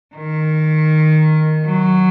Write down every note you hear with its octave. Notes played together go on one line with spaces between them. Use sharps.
D#3
F#3